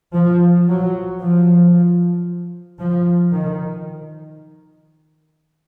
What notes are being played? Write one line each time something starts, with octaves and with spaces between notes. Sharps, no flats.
F3
F#3
F3
F3
D#3